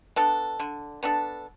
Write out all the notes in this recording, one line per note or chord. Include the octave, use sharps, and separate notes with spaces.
B3 D4 A4
D3
B3 D4 A4